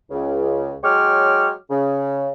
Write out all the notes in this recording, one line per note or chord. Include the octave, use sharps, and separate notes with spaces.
C#2 C#3
F#3 G#3 C#5 G5 D6 F6
C#3